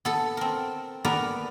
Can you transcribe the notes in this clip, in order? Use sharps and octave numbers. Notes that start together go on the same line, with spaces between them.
B3 A4
C4 A#4
B3 A#4 B4 D5 A#5